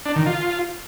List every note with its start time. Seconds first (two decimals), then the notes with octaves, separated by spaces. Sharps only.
0.06 D4
0.16 D#3
0.26 F4